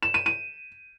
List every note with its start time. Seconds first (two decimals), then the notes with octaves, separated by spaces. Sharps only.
0.03 E7
0.14 D#7
0.26 D#7